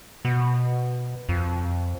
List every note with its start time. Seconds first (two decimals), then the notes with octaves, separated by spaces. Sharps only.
0.25 B2
1.29 F2